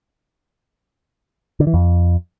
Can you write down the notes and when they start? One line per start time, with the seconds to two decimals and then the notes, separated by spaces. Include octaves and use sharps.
1.60 D3
1.67 E3
1.74 F2